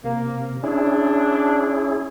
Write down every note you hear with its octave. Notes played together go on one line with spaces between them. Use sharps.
C3 A#3
C#4 D4 E4 G#4